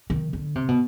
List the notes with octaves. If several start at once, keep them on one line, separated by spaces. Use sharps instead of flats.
D#3
D3
C3
B2